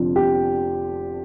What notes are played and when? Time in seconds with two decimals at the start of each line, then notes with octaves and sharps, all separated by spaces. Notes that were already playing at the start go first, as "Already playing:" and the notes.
Already playing: F1 F2 D3 F3
0.16 G4